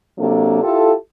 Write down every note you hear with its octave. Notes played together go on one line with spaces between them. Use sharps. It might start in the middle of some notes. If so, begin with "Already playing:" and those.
C3 F#3 A#3 D4 A4
E4 F4 G4 A4